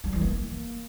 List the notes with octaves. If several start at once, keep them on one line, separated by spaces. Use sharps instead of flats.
G3
E3
A#3